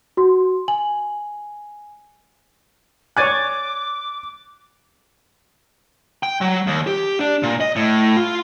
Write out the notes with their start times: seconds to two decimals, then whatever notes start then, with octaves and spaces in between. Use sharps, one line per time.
0.17 F#4 C6
0.68 G#5 F#7
3.17 C#5 D5 G#5 D6 F#6 A6
6.23 G5
6.41 F#3
6.67 D#2
6.87 G4
7.20 D4
7.43 A#2
7.61 D#5
7.76 A2
8.17 F4